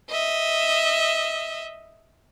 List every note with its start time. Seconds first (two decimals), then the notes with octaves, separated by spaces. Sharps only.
0.10 D#5 E5